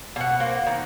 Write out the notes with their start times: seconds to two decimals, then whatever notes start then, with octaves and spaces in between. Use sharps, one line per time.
0.16 B2 F#5
0.40 A#3 C4 F#4
0.67 D#3